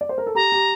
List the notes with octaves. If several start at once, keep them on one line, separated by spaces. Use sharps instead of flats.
D5
C5
A#4
A4
G4 A#5
G4